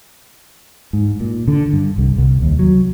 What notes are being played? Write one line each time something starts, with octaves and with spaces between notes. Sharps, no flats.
G#2
A#2
D3
G2
C2
C2
D#2
F#3